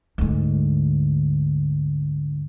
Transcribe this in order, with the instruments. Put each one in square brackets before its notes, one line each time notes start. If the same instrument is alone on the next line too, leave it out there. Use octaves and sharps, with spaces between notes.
[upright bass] D2 G#2